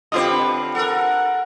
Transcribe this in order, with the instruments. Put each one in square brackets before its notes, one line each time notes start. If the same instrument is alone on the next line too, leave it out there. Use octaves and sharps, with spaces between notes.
[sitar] D3 G4 B4 [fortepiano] C4 F4 D#5
[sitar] A4 A#4 [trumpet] F#5